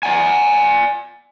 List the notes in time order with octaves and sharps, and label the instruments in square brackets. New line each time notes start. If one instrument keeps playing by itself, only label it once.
[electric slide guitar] D5 F#5 G#5